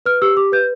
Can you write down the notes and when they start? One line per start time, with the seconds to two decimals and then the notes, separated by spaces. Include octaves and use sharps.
0.06 B4 F6
0.22 G4 E6
0.37 G4 D6
0.52 B4 G6